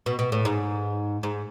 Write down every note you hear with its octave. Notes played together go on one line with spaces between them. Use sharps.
B2
B2
A2
G#2
G#2